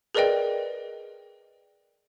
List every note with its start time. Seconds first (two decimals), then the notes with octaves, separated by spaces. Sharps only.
0.15 G#4 A#4 B4 D5 D#5 G5